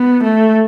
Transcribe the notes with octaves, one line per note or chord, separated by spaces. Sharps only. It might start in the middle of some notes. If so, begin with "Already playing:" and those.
Already playing: B3
A3